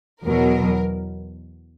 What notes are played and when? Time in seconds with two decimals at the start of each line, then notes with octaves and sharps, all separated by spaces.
0.23 E2 B2 F#3 A#4